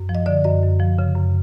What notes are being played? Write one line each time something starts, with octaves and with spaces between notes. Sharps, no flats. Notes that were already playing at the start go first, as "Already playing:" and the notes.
Already playing: F#2
F3
D#5
D3 D5
F#2 D#5
F#2
F3
C#3
F#2